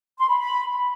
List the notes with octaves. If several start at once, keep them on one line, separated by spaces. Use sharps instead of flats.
C6
B5
B5